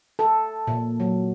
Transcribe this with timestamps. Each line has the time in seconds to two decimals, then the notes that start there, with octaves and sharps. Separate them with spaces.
0.19 A4
0.67 A#2
1.00 F#3